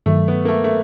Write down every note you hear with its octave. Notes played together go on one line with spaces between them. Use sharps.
G2 D#3 F#3 A3
B3
A#3
A3
A3